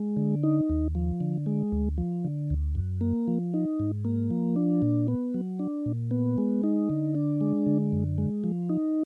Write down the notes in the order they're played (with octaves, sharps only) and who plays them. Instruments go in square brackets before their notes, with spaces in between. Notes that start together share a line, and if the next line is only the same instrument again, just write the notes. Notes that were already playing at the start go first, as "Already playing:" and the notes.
Already playing: [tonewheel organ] G#3
D3
D#4
D#2
F3
D3
G#3
D2
F3
D3
D2
F#2
A#3
F3
D#4
G#2
A#3
F3
D4
A#2
B3
F#3
D4
A#2
B3
G#3
D#4
D3
D4
G#3
D3
F#2
G#3
F3
D#4